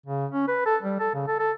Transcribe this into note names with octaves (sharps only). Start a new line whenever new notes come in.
C#3
C#4
B4
A4
G3
A4
C#3
A4
A4